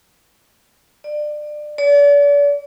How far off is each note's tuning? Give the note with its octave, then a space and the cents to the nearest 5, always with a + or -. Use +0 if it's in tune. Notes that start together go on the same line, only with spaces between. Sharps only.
D5 +25
D5 -40